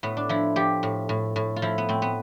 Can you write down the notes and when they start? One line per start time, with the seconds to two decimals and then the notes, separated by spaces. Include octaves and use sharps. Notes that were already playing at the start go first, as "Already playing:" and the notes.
0.03 A2 B3
0.17 D4
0.29 F3 E4
0.56 F3 G4
0.83 A2
1.09 A2
1.36 A2
1.56 F4
1.62 F3 E4
1.78 B3
1.89 A2 C4
2.02 B3